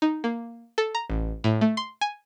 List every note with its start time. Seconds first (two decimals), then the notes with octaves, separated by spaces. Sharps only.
0.02 D#4
0.24 A#3
0.78 A4
0.95 A#5
1.10 A1
1.44 A2
1.61 A3
1.77 C6
2.01 G#5